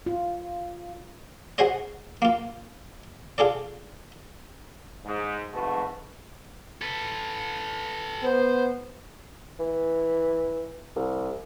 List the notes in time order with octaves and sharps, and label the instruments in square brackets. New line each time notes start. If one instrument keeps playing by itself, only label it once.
[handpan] F4
[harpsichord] F#4 G#4 C5 C#5 D#5
A#3 F4
F4 G#4 A4 D5
[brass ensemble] G#2
F#1 G#2 A3 F#4 B4
[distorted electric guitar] A4 B4
[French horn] B3 [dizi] C5
[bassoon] E3
C2